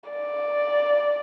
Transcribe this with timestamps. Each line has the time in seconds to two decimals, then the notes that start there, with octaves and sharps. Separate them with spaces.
0.10 D5